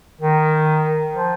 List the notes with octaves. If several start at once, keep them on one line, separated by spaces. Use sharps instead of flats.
D#3
F3